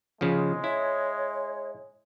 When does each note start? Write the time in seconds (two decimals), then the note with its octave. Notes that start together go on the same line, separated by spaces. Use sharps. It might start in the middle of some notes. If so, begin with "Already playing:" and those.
0.21 C#3 F3 G#3
0.64 E4 C#5